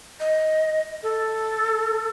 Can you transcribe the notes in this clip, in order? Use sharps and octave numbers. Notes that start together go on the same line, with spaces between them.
D#5
A4